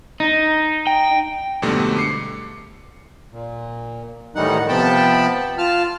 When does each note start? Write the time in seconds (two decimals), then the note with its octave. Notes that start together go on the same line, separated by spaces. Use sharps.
0.20 D#4
0.87 G5
1.62 F2 G#2 B2 D3 G3 A3
1.96 D6 C7 C#7
3.32 A#2
4.35 A2 D#3 E3 G3 D#4 F#5
4.68 C3 F3 B3 G5 A5 B5
5.58 F4 A5 F6